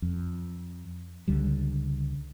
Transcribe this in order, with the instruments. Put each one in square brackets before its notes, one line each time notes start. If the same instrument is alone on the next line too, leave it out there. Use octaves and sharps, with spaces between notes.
[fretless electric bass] F2
C#2 D3 G3